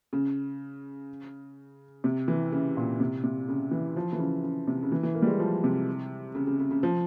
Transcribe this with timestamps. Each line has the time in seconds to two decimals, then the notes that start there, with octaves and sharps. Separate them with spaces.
0.13 C#3
2.04 C3
2.28 E3
2.52 C#3
2.77 A#2
3.00 C3
3.24 C3
3.48 C#3
3.71 E3
3.96 F3
4.13 E3
4.19 C#3
4.43 C#3
4.68 C3
4.83 C#3
4.92 E3
5.03 E3
5.15 A#3
5.22 G3
5.27 G#3
5.39 F3
5.64 C3
6.35 C#3
6.47 C#3
6.59 C#3
6.71 C#3
6.83 F3